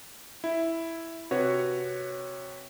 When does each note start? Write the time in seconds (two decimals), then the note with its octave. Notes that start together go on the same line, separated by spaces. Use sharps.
0.44 E4
1.31 C3 F#4 B4 C#5